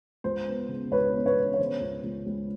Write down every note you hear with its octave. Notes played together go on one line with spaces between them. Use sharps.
C#2 C5
B3
C#3
C#2 B4 C#5
B3
B4 C#5
B3
C#5
C#3 C5
C#2
C#2
C#2